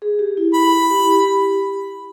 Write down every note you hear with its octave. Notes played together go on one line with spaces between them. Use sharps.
G#4
G4
E4
E4 B5
G4
E4
G4